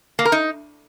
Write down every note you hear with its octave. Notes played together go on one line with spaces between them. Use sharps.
A#3
A#4
D#4